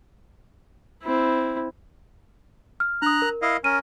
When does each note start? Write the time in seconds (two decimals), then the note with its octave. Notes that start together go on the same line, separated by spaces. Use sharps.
1.03 C4 E4
2.80 F6
3.02 D4 A#5 D#6 F#6
3.22 A#4
3.42 E4 D#5 F5
3.64 C#4 A#4 D#7